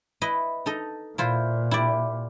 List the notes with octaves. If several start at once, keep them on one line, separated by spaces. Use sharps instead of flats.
E4 B4 D#5
D#4 A4 D#5
A#2 E4 F4 C5
E4 G4 D5